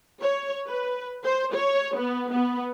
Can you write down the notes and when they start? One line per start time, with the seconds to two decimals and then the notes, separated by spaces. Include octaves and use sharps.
0.21 C#5
0.67 B4
1.23 C5
1.54 C#5
1.95 B3
2.31 B3